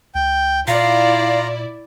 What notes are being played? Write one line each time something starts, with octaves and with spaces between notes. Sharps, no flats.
C#2 G5
A#2 E4 F4 D5 F5 A#5